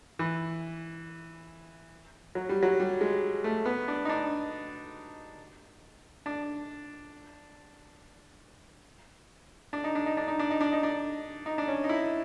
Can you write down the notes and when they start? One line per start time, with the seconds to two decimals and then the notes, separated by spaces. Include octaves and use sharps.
0.19 E3
2.35 F#3
2.49 G3
2.63 F#3
2.80 G3
3.01 G#3
3.44 A3
3.66 B3
3.88 D4
4.05 D#4
4.09 D4
6.26 D4
9.73 D4
9.84 D#4
9.95 D4
10.06 D#4
10.17 D4
10.28 D#4
10.39 D4
10.51 D#4
10.61 D4
10.73 D#4
10.83 D4
11.46 D#4
11.58 D4
11.68 C#4
11.84 D#4
11.89 E4